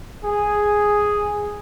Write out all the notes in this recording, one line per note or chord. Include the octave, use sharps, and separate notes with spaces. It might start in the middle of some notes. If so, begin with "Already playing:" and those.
G#4